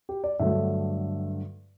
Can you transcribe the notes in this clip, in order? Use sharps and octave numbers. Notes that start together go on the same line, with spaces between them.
G4
D5
G2 D3 F#3 A3 E5